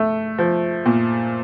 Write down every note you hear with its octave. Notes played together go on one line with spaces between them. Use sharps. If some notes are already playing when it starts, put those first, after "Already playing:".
Already playing: A3
F3
A#2